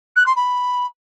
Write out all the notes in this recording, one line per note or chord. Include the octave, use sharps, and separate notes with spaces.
F#6
C6
B5